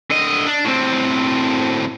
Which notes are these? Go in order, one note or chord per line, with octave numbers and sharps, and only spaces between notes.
D3 D#5
D4
A2 C4